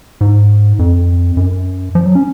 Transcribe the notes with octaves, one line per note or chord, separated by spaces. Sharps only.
G#2
F2
F#2
F3
F#3
C#4